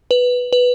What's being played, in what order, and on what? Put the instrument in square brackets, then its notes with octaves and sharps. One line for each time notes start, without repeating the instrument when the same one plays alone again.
[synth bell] B4
B4